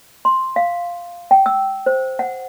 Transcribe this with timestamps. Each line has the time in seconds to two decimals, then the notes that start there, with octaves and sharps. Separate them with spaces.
0.25 C6
0.56 F5
1.31 G5
1.46 E6
1.86 C5
2.19 F#5